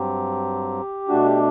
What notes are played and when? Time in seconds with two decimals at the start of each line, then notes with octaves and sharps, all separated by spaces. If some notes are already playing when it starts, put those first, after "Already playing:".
Already playing: G2 F#3 C4 G4
1.09 B2 A3 D4 F#4
1.26 G4